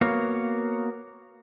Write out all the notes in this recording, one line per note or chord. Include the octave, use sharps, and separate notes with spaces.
A#3 B3 F#4 C#5 F5